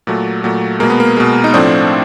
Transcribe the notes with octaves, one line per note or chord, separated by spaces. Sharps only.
A#2 F#3 A3
A#2 F#3 A3
B2 G#3 A#3
B3
A#3
B2 G#3
D#4
A2 F3 A3 C4 D4